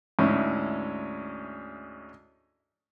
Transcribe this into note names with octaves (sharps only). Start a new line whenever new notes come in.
D2 G#2 C#4 E4